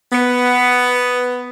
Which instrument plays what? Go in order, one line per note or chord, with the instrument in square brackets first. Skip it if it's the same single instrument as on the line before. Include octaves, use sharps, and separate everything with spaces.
[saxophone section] B3